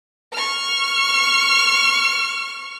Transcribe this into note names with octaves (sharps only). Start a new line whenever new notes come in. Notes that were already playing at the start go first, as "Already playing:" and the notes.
C#6 F6